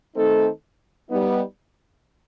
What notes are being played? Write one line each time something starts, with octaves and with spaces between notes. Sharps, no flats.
D#3 A3 C4 D#4 A4
G3 B3 D#4